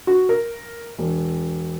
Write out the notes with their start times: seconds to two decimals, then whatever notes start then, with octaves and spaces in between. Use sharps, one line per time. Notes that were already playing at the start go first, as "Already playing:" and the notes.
0.07 F#4
0.29 A#4
0.98 E1